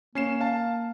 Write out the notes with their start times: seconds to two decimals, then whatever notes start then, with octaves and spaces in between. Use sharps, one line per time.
0.15 A#3 C#4 C7 E7
0.41 F5 A5